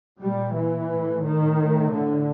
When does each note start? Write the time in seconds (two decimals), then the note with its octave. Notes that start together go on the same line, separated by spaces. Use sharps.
0.21 A#2 G3
0.55 E3
0.90 A2
1.24 D#3
1.58 A2
1.92 D3